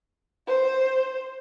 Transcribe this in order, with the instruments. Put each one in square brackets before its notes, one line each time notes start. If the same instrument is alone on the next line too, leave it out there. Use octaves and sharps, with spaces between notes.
[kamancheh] C5